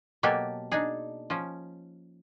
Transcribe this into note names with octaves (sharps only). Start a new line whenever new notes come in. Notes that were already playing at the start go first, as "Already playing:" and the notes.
B2 F#3 A#3 G4 A4 G#5
D4 D#4 G#4
F3 C#4